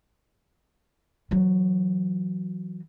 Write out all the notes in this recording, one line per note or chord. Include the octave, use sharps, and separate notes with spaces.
E3 F#3